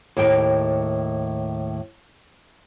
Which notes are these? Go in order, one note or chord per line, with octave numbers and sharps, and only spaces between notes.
D#2 A2 G5